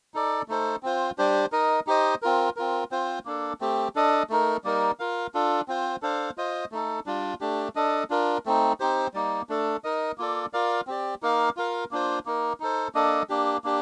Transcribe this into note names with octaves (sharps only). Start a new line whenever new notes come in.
D#4 A4 D5
A3 D#4 A4 C5
C4 F4 C5
G3 D4 G4 C5
D#4 A#4 D#5
D#4 G4 C5 D#5
C4 F4 A#4
C4 F4 A#4
C4 F4 C5
A#3 D4 A4
A3 C4 G4
D4 A4 D#5
A3 D#4 A#4
G3 A#3 D#4 A#4
F4 A#4 F5
D4 F4 A4
C4 F4 C5
D4 A4 C5 F5
F4 C5 D#5
A3 D#4 A4
G3 D4 F4
A3 D4 G4
D4 A4 D#5
D4 F4 A#4
A3 C4 D#4
C4 D#4 G4 C5
G3 A#3 D#4
A3 D4 A4
D#4 A#4 D#5
A#3 F4 A4 D5
F4 A#4 D5 F5
C4 G4 D5
A#3 D#4 A#4 F5
F4 A#4 F5
A#3 D4 F4 C5
A#3 D#4 A#4
D#4 A4 C5
A#3 D4 A4 D#5
A#3 D4 G4
A#3 D4 G4